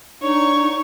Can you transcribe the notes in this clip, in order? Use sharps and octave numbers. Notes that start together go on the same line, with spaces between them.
D4 D#4 C#5 C#6